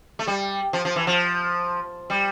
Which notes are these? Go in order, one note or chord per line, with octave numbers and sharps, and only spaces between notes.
A3
G3
F3
F3
E3
F3
G3